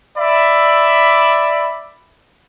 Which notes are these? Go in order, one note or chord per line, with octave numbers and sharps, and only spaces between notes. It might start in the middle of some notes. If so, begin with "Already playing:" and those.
D5 E5 B5